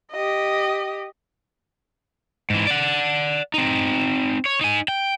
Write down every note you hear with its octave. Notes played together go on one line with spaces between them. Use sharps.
G4 D#5
G#2 E3
D5 F#5
C4 D#4
C#5
D#4 G#5
G5